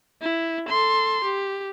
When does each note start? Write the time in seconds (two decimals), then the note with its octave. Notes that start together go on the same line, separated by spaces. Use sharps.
0.22 E4
0.69 A4 C6
1.24 G4